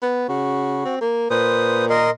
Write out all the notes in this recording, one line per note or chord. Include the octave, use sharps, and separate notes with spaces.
B3
C#3 F#4
C4
A#3
A#2 B4 C5 D#6
A#4 D#5 C6